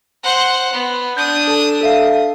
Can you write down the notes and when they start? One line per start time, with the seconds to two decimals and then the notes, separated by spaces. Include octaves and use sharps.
0.24 C5 F#5
0.73 B3
1.17 D4 D#6 G6
1.47 A4 A5
1.81 A4 E5 F5